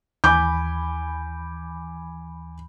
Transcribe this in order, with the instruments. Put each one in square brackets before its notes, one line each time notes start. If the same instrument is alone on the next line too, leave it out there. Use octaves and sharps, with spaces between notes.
[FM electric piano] D#2 E3 B5 [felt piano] G#5 D6 G6